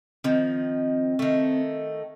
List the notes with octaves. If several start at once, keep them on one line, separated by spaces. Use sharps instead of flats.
D#3 F3 C4
D#3 A3